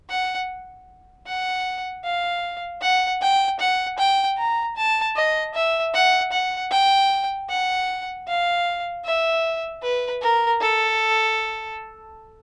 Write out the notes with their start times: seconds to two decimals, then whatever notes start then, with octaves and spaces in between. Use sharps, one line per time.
0.10 F#5
1.27 F#5
2.05 F5
2.82 F#5
3.22 G5
3.60 F#5
3.98 G5
4.38 A#5
4.77 A5
5.16 D#5
5.54 E5
5.94 F#5
6.32 F#5
6.71 G5
7.50 F#5
8.28 F5
9.05 E5
9.82 B4
10.22 A#4
10.61 A4